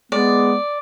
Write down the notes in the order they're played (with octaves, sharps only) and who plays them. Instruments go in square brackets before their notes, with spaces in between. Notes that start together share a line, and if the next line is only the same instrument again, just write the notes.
[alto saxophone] G#3 [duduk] B3 [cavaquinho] D5